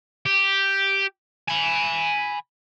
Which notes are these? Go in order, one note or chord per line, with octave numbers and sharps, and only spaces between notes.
G4
G#5 B5